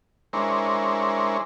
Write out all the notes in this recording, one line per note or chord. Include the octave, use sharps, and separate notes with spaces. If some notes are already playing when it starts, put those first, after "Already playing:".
G#3 D4 E4 A#4 C5 C#5